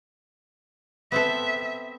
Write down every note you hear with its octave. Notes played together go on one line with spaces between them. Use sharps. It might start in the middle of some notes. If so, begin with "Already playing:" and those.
B3 C4 A4 E5